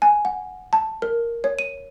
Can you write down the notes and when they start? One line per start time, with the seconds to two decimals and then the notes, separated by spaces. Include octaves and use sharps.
0.02 G#5
0.25 F#5
0.73 A5
1.02 A#4
1.44 C#5
1.59 D#7